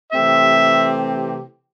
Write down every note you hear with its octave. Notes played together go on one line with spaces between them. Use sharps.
C3 E3 A3 C4 G4 E5